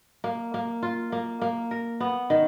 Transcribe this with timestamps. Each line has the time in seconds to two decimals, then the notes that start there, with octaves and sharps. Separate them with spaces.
0.24 A#3
0.54 A#3
0.83 F4
1.12 A#3
1.42 A#3
1.71 A#4
2.00 B3
2.30 D#3